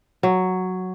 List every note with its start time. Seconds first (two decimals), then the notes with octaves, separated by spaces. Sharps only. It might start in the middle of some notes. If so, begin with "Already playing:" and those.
0.23 F#3